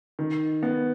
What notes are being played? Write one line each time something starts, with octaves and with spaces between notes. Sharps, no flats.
D#3
B3